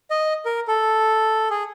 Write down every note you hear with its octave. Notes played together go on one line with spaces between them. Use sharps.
D#5
A#4
A4
G#4